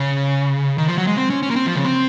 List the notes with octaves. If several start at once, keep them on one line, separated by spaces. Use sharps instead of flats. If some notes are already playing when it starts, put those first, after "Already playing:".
Already playing: C#3
D#3
F3
F#3
G#3
C4
C#4
C#4
A#3
C4
F3
C#3
C4